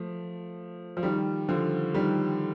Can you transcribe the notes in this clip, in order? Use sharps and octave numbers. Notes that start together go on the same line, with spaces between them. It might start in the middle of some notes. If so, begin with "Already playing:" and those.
Already playing: F3 A3
F3
D#3 G3
D3 F3
D#3 G3